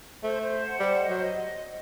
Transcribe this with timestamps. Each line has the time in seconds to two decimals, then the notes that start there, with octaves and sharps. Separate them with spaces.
0.23 A3 C5
0.42 C5
0.62 F#5
0.80 G3 C5
0.99 D#5
1.09 F#3
1.18 D#5